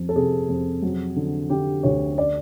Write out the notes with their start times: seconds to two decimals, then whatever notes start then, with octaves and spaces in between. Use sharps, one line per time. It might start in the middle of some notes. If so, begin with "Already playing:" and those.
Already playing: F2 F3
0.09 A4
0.16 C3 G#4
0.49 F2
0.82 F#3
1.16 D3
1.50 D3 G4
1.83 D2 C#5
2.18 D5